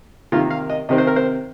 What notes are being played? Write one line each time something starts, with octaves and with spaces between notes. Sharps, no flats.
C3 D#3 A#3 F4
F5
D#5
C3 D#3 C4 D#5
C5
A#4
C5